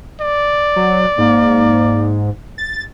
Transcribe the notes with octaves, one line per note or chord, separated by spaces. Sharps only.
D5
F#3
G#2 A#3
A6